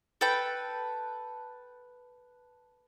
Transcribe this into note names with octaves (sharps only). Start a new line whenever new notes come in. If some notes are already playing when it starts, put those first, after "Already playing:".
A4 B4 G5